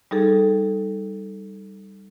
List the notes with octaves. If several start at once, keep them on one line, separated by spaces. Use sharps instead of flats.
G3 D#4 G#4 A4